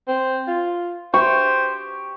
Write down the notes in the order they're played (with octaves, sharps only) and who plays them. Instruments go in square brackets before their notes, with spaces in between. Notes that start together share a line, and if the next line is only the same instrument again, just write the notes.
[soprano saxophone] C4
F4
[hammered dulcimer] G4 C#6 [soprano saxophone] C5